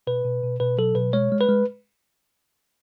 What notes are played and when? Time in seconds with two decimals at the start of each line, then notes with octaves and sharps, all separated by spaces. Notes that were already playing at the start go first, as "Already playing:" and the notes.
0.07 B2 B4
0.25 B2
0.43 B2
0.60 B2 B4
0.78 F#3 A4
0.95 B2 B4
1.13 G#3 C#5
1.32 G#3
1.41 B4
1.49 G#3